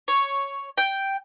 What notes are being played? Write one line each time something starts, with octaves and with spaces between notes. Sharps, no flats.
C#5
G5